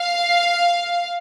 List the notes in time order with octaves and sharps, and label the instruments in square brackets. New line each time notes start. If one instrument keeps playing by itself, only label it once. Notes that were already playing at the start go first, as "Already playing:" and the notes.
Already playing: [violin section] F5